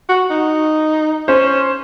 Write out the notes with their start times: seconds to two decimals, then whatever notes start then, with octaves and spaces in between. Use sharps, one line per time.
0.09 F#4
0.30 D#4
1.28 C#4 C5